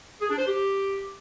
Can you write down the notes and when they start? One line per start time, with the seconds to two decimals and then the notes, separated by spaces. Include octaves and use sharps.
0.21 G#4
0.30 D4
0.38 C5
0.47 G4